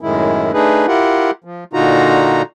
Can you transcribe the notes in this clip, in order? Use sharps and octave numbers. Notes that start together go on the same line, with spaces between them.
F#2 A2 D#3 G#3 E4
A3 D4 D#4 G#4 B4
E4 F4 G4 A#4 F#5
F3
A#2 D3 D#4 F4 F#4 A#5